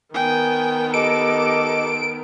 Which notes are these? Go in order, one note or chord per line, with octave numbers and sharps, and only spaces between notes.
D#3 B3 G5 G#5
G4 A4 D#5 D6 D7